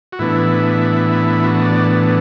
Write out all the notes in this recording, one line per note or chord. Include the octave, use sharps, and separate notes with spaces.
F#4
A2 E3 B3 D4 E4
F#4
D5